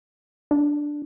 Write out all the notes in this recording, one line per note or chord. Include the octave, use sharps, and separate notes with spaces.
D4